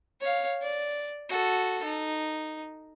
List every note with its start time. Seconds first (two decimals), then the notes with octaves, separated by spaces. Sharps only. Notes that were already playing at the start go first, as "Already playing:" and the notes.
0.21 C#5 F5
0.62 D5
1.29 F#4 A4
1.84 D#4